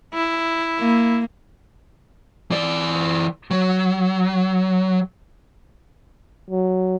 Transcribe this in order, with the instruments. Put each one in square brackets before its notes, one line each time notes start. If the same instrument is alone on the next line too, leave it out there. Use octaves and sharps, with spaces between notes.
[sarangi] E4
[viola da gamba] A#3
[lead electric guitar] E3 D5
F#3
[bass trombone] F#3